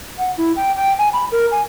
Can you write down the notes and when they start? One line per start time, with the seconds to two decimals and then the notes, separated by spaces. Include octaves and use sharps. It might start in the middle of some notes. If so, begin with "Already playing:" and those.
0.18 F#5
0.38 E4
0.56 G5
0.76 G5
0.98 G#5
1.13 B5
1.32 A#4
1.51 G#5